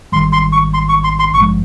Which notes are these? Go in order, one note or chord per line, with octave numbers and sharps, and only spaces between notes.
G#1 G#2 D#3 G3 C6
C6
C#6
C6
C#6
C6
C6
G#1 G2 F3 G#3 C#6